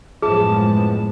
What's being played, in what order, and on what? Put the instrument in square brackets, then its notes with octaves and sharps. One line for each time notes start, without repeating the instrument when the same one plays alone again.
[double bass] F#2 F3 [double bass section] A2 G#3 B3 [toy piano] G#4 [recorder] A5